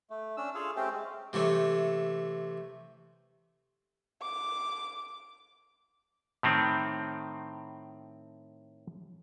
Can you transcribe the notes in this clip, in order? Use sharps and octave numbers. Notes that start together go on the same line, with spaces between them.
A3
C#4 D4 E6
F4 G#4 A4 F5
A3 C4 C#4 G4
G#3
C3 E3 A3 C#5
D6
A2 D#3 C4